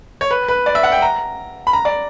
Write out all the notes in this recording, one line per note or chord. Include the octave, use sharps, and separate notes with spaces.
C#5
B4
B4
D5
E5
F#5
G5
A#5
B5
A#5
D5